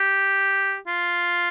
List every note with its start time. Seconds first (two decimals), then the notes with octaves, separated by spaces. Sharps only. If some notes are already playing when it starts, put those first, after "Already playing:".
Already playing: G4
0.87 F4